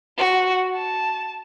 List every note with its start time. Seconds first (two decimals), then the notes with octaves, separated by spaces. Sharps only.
0.18 F#4
0.74 A5